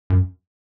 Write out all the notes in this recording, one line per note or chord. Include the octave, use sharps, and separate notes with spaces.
F#2